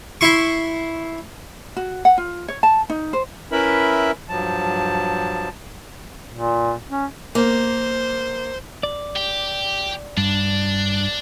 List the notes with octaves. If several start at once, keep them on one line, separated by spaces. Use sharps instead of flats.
E4 C6 C#6
F#4
F#5
F4
C#5
A5
D#4
C5
C#4 E4 A#4 B4 E5 B5
G2 F3 F#3 A5
A#2
C#4
A#3 C5
D5
G4
G2 D4